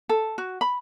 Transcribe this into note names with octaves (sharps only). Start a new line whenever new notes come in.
A4
F#4
B5